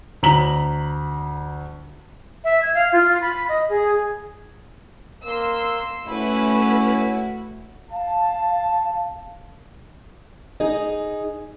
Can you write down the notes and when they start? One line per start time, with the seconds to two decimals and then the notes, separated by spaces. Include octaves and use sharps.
0.23 D2 A#5 B6 F#7
2.44 E5
2.62 G#6
2.75 F5
2.92 F4
3.21 B5
3.49 D#5
3.69 G#4
5.25 A#3 C6 E6
6.07 A3 C#4 E4 F#4 B4
7.92 F5 A5
10.60 D#4 G#4 D#5